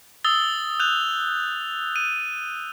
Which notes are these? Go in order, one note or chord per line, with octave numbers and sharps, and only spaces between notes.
D#6 E6 A6 G7
F#6 G6 F7
D#7